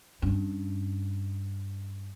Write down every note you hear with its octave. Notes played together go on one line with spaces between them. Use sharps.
G2 C#4